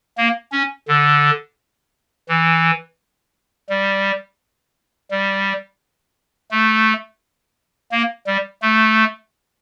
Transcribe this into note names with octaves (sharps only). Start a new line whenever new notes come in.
A#3
C#4
D3
E3
G3
G3
A3
A#3
G3
A3